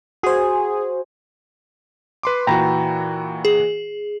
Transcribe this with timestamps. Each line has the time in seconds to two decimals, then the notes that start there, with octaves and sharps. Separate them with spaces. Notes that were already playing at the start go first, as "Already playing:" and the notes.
0.23 F#4 G#4 C5
2.23 B4 C6 D6
2.47 A#2 E3 F#4 G5 A#5 B5
3.45 G#4